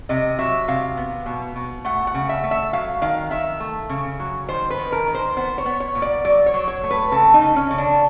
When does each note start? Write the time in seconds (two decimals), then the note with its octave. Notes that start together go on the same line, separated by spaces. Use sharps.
0.09 C3 D#5
0.39 F#3 E5
0.68 C3 F5
0.97 B3
1.26 B2
1.56 B2
1.85 A3 F#5
2.07 F#5
2.14 C#3
2.29 E5
2.43 A3
2.51 E5
2.73 F#3 F5
3.02 D#3 F5
3.31 D#3 E5
3.60 A3
3.89 C#3
4.20 F#3
4.48 D#3 C5
4.70 B4
4.78 D#3
4.92 A#4
5.07 D#3
5.15 C5
5.37 B3 C5
5.58 C#5
5.66 B3
5.80 C#5
5.95 A#2
6.02 D5
6.24 F#3 D5
6.46 C#5
6.54 F#3
6.68 C#5
6.83 A3
6.91 B4
7.12 C#3 A4
7.34 D#4
7.41 C#3
7.56 C#4
7.71 C#3
7.78 D4